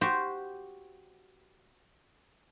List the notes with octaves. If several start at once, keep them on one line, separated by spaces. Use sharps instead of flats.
F#4 G4 C5